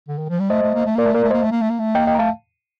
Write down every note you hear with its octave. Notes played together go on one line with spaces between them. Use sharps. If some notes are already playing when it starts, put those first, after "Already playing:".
D3
D#3
F3
G3
A3 C5 D#5
A3
A#3
A3
A#3 A#4 D5
A3
A#3 A#4 D5
A3
A#3 C5 D#5
A3
A#3
A3
A#3
A3
A#3 D#5 G5
D#5 G5
A#5
A3 F5 A5